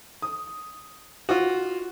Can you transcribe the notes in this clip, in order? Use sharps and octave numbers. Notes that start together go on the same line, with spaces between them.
D#6
F4 F#4